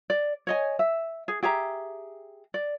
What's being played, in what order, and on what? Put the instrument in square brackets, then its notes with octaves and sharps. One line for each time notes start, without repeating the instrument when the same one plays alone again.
[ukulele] D5
C#5 D#5 G#5
E5
G#4
G4 G#4 E5 A#5
D5